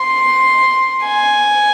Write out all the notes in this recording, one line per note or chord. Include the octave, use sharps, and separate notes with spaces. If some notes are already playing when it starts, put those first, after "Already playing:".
Already playing: C6
G#5